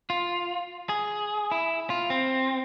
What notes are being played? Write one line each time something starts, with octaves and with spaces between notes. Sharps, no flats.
F4
G#4
E4
F4
C4